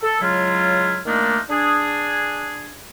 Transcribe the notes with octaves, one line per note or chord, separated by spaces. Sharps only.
A4
C#3 F#3 G#3 E4 F4
D#3 A3 A#3 D4 D#4 F4
D4 G#4